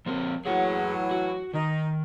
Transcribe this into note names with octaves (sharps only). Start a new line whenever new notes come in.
F3 C4 A#4
A2 E3 F#3 G#4 F#5
F#4
D#3 D#4